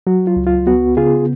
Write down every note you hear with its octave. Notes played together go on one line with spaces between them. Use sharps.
F#3 F#4
F4
C#2
F4
B3 F#4
C#3 F4 G#4